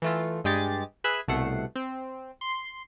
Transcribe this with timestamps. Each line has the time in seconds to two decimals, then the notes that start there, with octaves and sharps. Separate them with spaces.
0.02 E3 A3 F4
0.44 G2 G#3 G4 G#4 A6
1.04 G#4 B4 E5 F#6
1.28 C2 B2 A3 F#5 C7
1.75 C4
2.41 C6